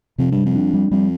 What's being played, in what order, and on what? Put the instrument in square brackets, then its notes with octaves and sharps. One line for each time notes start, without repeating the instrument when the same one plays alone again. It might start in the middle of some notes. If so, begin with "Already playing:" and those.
[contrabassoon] F2 [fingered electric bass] C3
[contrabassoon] G2
[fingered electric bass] G3
[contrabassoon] F2
[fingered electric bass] D4
G3
[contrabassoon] F2 [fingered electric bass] G3